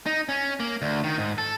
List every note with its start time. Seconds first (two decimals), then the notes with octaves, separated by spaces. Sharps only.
0.06 D#4
0.29 C#4
0.60 A#3
0.82 D2
1.04 D#3
1.18 G#2
1.38 A4